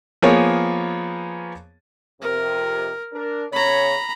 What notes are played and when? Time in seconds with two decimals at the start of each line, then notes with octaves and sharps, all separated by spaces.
0.22 F3 A#3 B3 G#4 C#5
2.21 F2 C3 A#4
3.13 D4 A#4
3.53 C#3 C#5 A#5 B5